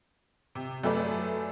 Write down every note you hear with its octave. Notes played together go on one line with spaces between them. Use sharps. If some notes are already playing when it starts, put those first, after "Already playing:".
C3
F#2 A3 G#4 A4 B4 D5